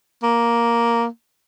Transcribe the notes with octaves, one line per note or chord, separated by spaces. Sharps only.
A#3